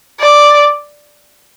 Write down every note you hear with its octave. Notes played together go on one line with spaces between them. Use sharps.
D5